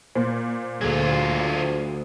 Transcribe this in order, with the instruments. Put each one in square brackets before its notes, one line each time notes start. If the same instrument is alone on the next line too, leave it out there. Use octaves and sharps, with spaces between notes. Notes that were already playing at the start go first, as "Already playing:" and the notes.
[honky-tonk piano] A#2 [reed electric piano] C5
[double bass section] D2 [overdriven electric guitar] F#3 F4 [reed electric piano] G#4 A4